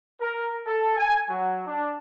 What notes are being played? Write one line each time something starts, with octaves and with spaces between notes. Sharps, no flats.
A#4
A4
G#5
F#3
D4